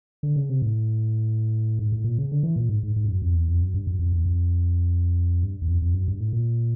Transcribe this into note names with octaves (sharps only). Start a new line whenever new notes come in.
D3
C#3
C3
A2
G#2
A2
A#2
C#3
D3
E3
A#2
G#2
G#2
G#2
G2
F#2
F2
E2
F2
F#2
G2
F#2
F2
E2
F2
G2
E2
F2
F2
F#2
G2
A2
A#2